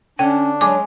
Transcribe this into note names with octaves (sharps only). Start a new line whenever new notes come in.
D3 C#4 D4 C#5 G5
F#3 G#3 C#4 G#4 D6